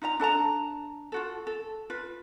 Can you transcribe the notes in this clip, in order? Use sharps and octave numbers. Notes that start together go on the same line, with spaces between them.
D#4 F4 D#5 A#5
D4 A4 A5 A#5
F4 F#4 A4
A4
F4 B4